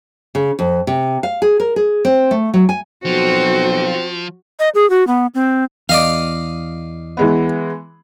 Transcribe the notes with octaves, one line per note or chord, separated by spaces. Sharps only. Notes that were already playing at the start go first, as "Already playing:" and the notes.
C#3
F2
C3
F5
G#4
A#4
G#4
C4
A3
F#3
G#5
B1 F3 C4 F#4
D#5
G#4
F#4
B3
C4
E2 D5 D#5 F5
E3 G#3 B3